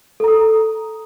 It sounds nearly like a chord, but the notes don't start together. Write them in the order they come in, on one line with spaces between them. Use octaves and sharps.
A4 A#5 D#6